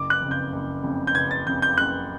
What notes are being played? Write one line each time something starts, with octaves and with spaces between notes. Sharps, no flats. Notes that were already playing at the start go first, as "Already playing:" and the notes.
Already playing: F#1 D6
F#6
F2 C#3
G6
F#1
F2 C#3
G6
F#1 G#6
A6
F2 C#3 G6
G6
F#1 F#6